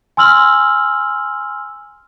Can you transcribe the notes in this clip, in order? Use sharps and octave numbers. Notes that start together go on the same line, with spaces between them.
G#5 C6 E6 F6 F#7